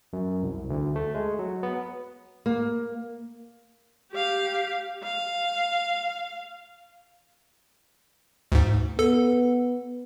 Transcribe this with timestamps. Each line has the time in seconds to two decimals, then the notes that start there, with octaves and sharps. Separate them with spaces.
0.13 F#2
0.43 C2
0.70 D2
0.96 A3
1.15 G#3
1.39 F#3
1.63 B3
2.46 A#3
4.12 G4 F5
5.03 F5
8.52 D2 G#2
8.99 B3 A4